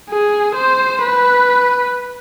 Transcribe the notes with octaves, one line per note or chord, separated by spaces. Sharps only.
G#4
C5
B4